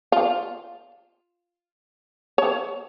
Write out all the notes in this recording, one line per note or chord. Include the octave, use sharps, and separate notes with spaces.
F4
C#5